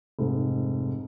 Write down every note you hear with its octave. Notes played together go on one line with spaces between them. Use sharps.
F1 G#2